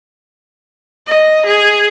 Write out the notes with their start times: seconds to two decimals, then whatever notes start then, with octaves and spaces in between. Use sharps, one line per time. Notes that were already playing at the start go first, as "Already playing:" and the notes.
1.07 D#5
1.46 G#4